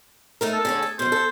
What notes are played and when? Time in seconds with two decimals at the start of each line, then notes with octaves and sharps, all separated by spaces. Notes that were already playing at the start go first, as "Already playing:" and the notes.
0.41 A3 D#4 A#4
0.53 A4
0.65 D3 G#4 C#5
0.83 G#4
0.99 F#2 B2 C5
1.12 A4